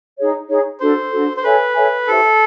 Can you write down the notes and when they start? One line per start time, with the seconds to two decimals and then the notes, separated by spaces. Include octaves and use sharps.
0.17 D#4 G#4 C#5
0.48 D#4 G#4 C#5
0.80 D4 F#4 A4 C5
1.12 D4 F#4 A4
1.37 C5
1.44 A4 B4 C#5 E5 G#5
1.75 A4 C#5 E5 G#5
2.06 E4 G4 A4 C5 E5